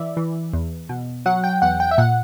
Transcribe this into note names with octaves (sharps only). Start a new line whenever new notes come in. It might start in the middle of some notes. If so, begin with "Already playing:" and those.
Already playing: E3 D5 E5
E3
E2
B2
F#3 F#5
G5
E2 F#5
G5
E5
A#2 F#5